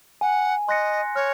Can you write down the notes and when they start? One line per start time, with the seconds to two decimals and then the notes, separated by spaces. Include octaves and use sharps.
0.21 F#5 G#5
0.68 D#5 C6 F#6 A#6 C#7
1.15 C#5 F6